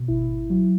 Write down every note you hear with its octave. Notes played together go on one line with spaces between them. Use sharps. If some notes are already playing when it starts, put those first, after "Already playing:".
Already playing: B2
G#1 E4
G#1
F#3